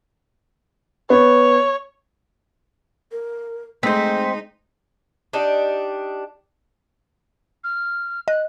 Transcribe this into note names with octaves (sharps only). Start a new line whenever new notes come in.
B3 C#5
A#4
G#3 A3 C4 D#4 C5 B6
D4 D#4 G4
F6
D#5 F#6